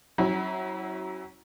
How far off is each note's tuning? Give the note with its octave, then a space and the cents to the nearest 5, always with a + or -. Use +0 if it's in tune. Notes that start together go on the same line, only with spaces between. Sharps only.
F#3 +25 C#4 -30 E4 -25